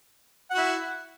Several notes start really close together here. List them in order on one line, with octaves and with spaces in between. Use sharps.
F#5 F#4 E4